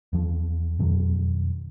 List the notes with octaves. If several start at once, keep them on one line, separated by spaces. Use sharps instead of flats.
E2 F3
F2 B2 D#3 F#3